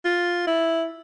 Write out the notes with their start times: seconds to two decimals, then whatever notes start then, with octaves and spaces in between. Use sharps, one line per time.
0.05 F4
0.47 E4